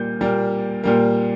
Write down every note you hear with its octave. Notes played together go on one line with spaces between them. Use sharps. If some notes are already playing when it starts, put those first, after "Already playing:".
Already playing: A#2 G3 A#3 G6
A#2 G3 A#3
A#2 G3 A#3